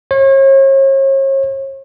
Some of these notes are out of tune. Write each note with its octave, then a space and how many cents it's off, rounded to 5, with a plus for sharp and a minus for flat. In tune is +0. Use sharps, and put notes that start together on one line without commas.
C#5 -40